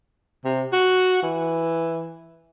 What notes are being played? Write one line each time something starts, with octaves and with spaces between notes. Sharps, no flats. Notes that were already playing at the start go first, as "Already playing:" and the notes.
C3
F#4
E3